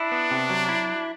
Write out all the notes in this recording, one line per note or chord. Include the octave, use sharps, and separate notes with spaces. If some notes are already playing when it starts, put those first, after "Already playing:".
Already playing: D4 E4
B3
C3
F#3
E4